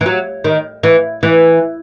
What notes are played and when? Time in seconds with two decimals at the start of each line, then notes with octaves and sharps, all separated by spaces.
0.01 E3
0.06 F#3
0.44 D#3
0.83 E3
1.23 E3